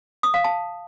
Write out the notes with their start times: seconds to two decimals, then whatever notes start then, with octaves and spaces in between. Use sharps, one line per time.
0.23 D#6
0.34 F5
0.44 A5